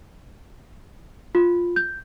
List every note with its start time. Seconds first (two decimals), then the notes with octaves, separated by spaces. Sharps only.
1.35 F4
1.76 G6